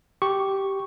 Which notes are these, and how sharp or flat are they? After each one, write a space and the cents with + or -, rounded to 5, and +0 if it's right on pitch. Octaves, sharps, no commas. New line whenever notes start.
G4 -10 C#6 +0